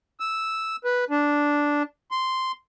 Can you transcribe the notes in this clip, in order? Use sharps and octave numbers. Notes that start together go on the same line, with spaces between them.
E6
B4
D4
C6